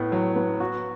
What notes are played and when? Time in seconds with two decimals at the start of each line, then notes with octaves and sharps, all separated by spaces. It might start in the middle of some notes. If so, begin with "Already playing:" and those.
Already playing: A2 B3
0.12 F#3
0.36 B3
0.60 F#4